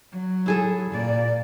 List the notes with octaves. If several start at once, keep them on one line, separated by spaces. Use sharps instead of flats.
F#3
E4 G#4 A4
A#2 D5